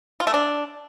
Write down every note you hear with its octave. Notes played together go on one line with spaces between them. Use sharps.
F4
A3
D4